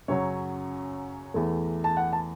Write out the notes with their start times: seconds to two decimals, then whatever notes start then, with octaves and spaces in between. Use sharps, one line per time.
0.08 F#2 C#3 F#3 C#5
1.34 E2 E3 A3
1.84 A5
1.97 F#5
2.13 A5